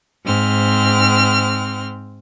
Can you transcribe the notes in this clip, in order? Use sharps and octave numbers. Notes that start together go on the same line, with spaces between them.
G#2 C4 F6